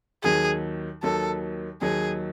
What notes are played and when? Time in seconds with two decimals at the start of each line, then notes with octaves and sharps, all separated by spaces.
0.23 D#2 D#3 F#3 G#4
1.03 D#2 D#3 F#3 A4
1.81 D#2 D#3 F#3 G#4